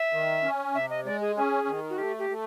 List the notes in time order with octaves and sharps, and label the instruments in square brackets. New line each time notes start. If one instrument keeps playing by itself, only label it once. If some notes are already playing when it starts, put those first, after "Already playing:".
Already playing: [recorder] E5
[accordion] D#3
C#4
[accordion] C3 [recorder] E5
[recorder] D#5
[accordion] G#3 [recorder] D5
[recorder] G#4
[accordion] C#4 [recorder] G#4
[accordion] D#3
[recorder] F#4
[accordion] A3 [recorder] G4
[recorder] G4
[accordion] A3